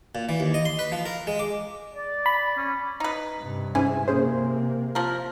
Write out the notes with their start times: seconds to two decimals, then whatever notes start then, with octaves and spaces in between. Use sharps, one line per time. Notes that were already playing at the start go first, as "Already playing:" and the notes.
0.15 A#2
0.29 E3
0.40 D#2
0.54 D#5
0.65 C6
0.79 B4
0.92 F3
1.06 A#4
1.27 G#3
1.39 D6
1.94 D5
2.26 B5
2.57 C#4
3.00 D#4 B4
3.39 G2 C3
3.75 G#2 E3 C#4 G#5
4.08 C3 A#3 C#4 G#4 C5
4.95 F3 A#4